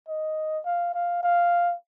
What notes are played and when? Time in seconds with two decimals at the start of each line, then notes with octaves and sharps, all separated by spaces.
0.08 D#5
0.65 F5
0.94 F5
1.23 F5